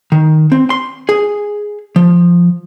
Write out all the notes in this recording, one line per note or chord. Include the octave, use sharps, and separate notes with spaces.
D#3
C4
C6
G#4
F3